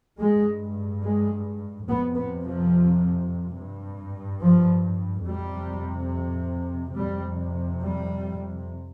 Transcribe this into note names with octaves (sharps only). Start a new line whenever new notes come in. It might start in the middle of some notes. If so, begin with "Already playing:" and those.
G2 G#3
G#3
F2 C3 B3
B3
F3
G2
F3
F2 C3 G3
F2 C3 G3
G3